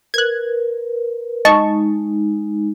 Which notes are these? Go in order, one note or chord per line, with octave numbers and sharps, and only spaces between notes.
A#4 B4 F#6 G#6
G#3 D#4 D#5 A5 C#6